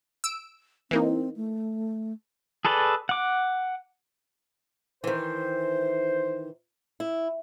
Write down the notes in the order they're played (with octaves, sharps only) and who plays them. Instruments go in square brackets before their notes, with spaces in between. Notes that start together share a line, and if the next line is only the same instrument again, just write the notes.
[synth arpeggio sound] E6 D7
[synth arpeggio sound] E3 A#3 D#4 [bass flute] C4
[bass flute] A3
[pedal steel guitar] G#4 A4 B4 D5
F#5 D6
[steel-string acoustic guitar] D#3 E3 [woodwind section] C5
[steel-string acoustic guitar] E4